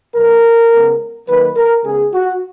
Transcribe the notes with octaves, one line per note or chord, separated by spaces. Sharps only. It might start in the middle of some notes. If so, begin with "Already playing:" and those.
B2 F#3 B3 A#4
C#3 G#3 B3
D#3 F#3 A#3 B4
A#4
C#3 G#3 B3 G#4
F#4